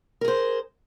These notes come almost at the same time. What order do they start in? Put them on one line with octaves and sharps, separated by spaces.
A#4 G#4 C5